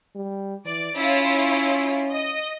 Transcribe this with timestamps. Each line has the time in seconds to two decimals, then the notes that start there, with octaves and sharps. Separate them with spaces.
0.15 G3
0.65 E3 D5
0.96 C#4 E4 F4 C#5
2.10 D#5